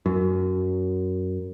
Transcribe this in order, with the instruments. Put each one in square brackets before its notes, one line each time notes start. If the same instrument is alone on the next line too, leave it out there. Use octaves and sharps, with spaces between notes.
[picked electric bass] F#2